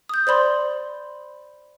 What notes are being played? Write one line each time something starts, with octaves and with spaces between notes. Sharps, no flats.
D#6 G6
C5 D5 B5 C6